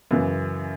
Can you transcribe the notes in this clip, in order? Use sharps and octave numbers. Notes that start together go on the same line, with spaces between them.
F#2 C#3 E3